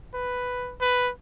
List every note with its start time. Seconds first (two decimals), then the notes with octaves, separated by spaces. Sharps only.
0.14 B4
0.81 B4